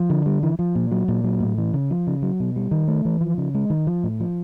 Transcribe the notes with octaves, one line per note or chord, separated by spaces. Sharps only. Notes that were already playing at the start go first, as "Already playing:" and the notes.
Already playing: F3
D3
G3
E3
F3
A#2
F#3
A#2
F#3
A2
E3
C#3
F3
C#3
F#3
B2
G3
D#3
A3
E3
F3
C#3
G#3
D#3
F3
A2
F3